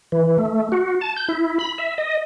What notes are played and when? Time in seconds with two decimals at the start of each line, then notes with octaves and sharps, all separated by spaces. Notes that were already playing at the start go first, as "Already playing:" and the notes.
0.12 E3
0.38 A3
0.72 F#4
1.01 A5
1.17 G6
1.28 E4
1.59 B5
1.78 E5
1.98 D#5